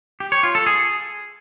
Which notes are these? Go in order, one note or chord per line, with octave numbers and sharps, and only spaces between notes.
G4
C#5
F4
A4
G#4